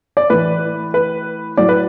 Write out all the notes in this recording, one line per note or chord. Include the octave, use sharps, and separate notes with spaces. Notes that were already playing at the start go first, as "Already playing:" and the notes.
D5
A2 E3 B4
B4
A2 F#3 D5
B4